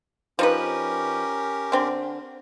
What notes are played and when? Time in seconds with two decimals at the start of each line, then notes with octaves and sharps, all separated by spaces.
0.39 F3 C#4 D#4 G4 A#4 B4
1.72 D3 C4